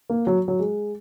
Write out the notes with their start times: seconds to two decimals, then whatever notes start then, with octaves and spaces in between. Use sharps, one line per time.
0.09 A#3
0.27 F#3
0.48 F#3
0.60 G#3